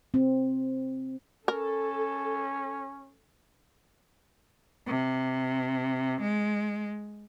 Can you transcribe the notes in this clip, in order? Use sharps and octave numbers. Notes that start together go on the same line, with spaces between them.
C4
C#4 A4 A#4
C3
G#3